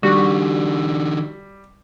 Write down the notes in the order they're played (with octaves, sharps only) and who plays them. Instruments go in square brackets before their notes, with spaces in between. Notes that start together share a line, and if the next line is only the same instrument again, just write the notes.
[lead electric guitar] D#3 D4 [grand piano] G3 [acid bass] F#4